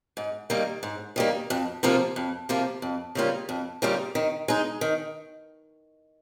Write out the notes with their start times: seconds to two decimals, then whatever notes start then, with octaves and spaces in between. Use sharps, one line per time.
0.17 G#2
0.50 D#3 G3 A#3
0.83 G#2
1.16 D#3 G3 A#3
1.50 F2
1.83 C3 F3 A#3 F4
2.16 F2
2.49 C3 F3 A#3 F4
2.82 F2
3.15 C#3 G3 A#3 F4
3.49 F2
3.82 C#3 G3 A#3 F4
4.15 D#3
4.48 G#3 D#4
4.81 D#3